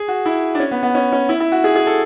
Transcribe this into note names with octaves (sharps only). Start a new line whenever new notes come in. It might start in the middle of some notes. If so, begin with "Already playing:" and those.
Already playing: G#4
F#4
E4
D4
C#4
B3
B3
C#4
C#4
E4
E4
F#4
G#4
G#4
A4